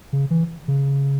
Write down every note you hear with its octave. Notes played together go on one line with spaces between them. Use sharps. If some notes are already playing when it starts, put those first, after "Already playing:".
C#3
E3
C#3